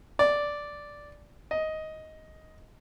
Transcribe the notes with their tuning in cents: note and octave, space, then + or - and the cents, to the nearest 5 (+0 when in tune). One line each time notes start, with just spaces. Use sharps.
D5 -5
D#5 +10